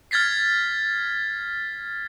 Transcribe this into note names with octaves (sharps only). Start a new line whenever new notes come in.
F6 G#6 A6 B6 C7